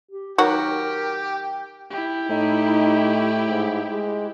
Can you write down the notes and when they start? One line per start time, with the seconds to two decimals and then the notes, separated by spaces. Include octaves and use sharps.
0.11 G4
0.38 D#3 F#3 F#4 G4 A#4
1.31 G5
1.91 E4 G4
2.29 A2 D#4
3.49 G#2
3.90 G#3